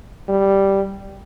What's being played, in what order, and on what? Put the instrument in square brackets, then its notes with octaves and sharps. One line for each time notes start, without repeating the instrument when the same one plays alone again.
[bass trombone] G3